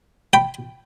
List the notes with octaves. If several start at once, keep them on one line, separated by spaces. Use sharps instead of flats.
G5 B5